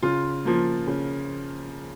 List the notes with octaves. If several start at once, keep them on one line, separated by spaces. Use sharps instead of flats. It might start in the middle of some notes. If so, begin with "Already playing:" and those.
C#3 F4
F3 A#3
C#3